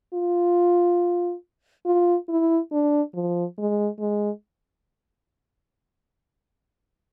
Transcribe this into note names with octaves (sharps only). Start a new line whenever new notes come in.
F4
F4
E4
D4
F3
G#3
G#3